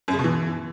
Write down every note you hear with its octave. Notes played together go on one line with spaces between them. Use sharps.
F#2
C#3
B2
E3